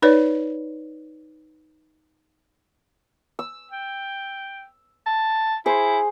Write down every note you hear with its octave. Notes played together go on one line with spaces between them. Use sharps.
D#4 B4 C#5 D5
E6
G5
A5
E4 G#4 C5